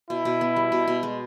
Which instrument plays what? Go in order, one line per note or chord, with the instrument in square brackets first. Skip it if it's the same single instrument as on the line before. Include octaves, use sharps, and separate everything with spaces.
[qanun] B2 [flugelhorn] E4
[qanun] B2
B3
G3
B2
B2
G#3